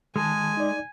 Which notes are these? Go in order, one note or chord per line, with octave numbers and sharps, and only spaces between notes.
D#3 G#3 G#5 A5
D#4 D5